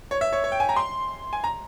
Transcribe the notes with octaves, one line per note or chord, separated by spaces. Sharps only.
C#5
E5
C#5
C#5
G5
G#5
A#5
C6
G#5
A#5